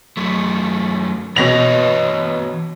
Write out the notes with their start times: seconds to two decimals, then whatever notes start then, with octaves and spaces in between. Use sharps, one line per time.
0.17 F#2 F#3 A3
1.36 B2 E3 C#5 D#5 A#6 F7